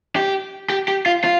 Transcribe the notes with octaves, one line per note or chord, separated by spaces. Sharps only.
G4
G4
G4
F4
F4